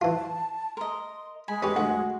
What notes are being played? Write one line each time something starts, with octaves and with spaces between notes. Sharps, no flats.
E3 F4 A5
A#4 D#5 C6
G#3 G#5 B5
C#4 G4 B4 C#5
D2 F#4